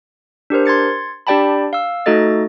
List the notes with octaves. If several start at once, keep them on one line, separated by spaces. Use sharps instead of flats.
D4 G4 A#4 C5
C6 G#6 A6 C#7
D4 G4 D5 G5 A5 B5
F5 E6
A3 D#4 F#4 A4 D#5 A6